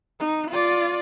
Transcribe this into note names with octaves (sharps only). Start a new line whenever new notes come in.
D#4
F4 D5